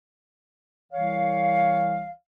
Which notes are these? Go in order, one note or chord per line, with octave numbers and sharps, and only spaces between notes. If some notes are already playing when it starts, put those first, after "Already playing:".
C2 E3 C#5 F5